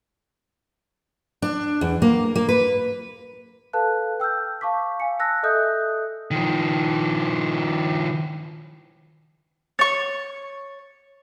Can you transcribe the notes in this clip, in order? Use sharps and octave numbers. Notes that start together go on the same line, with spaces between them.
D4
E2
A#3
A#3
B4
A4 B4 F5 A5 F#6
G5 E6 F6 G6
F5 A5 C#6 D6 B6
F5 G#5 C#7
A5 E6 F#6 A#6
A4 D#5 E5 D#6 F#6 G6
D#3 F3
C#5 C#6 A6